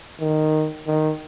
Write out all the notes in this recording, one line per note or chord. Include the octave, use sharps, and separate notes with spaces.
D#3
D#3